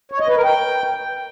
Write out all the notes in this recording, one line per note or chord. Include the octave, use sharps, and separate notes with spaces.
C#5
D#5
B4
A#4
G5